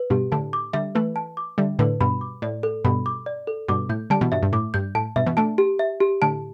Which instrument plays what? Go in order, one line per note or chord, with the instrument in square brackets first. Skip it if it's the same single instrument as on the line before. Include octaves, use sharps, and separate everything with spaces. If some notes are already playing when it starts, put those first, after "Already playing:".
Already playing: [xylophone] B4
[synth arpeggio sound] G2 B2 [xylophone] G4
[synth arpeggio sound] A2 D3 [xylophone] A5
[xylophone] D6
[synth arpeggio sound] D3 G3 [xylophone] E5
[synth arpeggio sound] E3 A3 [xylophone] B4
[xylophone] A5
D6
[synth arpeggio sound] D3 G3 [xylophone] E5
[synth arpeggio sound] A2 D3 [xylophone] B4
[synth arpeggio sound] G2 B2 [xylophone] B5
[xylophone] D6
[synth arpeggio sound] A2 [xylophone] D5
[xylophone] A4
[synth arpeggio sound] G2 B2 [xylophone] B5
[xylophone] D6
D5
A4
[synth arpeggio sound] G2 B2 [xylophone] D6
[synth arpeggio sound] A2 [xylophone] G6
[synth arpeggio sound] D3 G3 [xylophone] A5
[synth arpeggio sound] B2 E3
[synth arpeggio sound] G2 B2 [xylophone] E5
[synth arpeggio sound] G2
[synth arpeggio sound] A2 [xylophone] D6
[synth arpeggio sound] G2 [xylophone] G6
[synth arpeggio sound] A2 [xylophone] A5
[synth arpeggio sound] G2 B2 [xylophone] E5
[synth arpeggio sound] B2 E3
[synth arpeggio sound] A3 D4 [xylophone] A5
[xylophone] G4
E5
G4
[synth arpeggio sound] A2 D3 [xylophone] A5